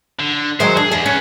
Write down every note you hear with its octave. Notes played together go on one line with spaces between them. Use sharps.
D3
D#3 F#3 G#3 C5
D4 G#4
E2 G#4
C#4 B4 C#5